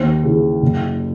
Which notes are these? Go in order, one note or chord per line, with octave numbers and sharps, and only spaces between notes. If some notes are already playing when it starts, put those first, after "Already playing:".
Already playing: D#2 C5
C#3 E3
F#1